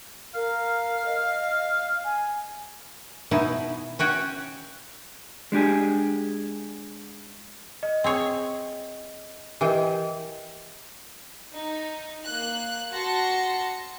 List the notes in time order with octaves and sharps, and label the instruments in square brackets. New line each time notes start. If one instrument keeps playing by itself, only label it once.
[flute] A#4 [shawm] F5
[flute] D#5
G#5
[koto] B2 D#4 E4
C#4 F#4 G5
[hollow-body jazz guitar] G#3 D4 G4 G#4
[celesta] D#5
[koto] C4 G#4 C#5
[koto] E3 G5 [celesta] G4 A#4 D#5
[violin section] D#4
A#3 F#6
F#4 A5 C6 A#6 C#7